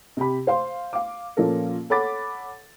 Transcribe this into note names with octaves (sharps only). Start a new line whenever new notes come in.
C3 G4 B5
C5 F5 C6
F5 D6
A#2 F3 A#3 C#4 A4 A#4
A4 C#5 F#5 B5 D6 A6